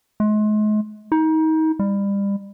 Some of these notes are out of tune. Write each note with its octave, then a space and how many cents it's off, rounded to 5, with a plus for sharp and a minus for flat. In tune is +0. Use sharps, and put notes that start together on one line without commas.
G#3 +40
D#4 +30
G3 +30